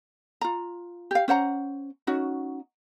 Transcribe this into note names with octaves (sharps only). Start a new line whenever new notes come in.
F4 A#5
G4 F5
C#4 C5 F#5 A#5
C#4 D#4 F#4